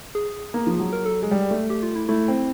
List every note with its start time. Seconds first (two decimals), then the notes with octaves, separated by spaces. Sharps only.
0.15 G#4
0.54 A#3
0.67 F3
0.80 F#3
0.93 A#4
1.06 A4
1.22 G#3
1.31 G3
1.51 A3
1.70 G4
1.83 F4
1.95 E4
2.09 A3 E4
2.28 C4